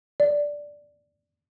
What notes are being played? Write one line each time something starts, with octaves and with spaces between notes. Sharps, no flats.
D5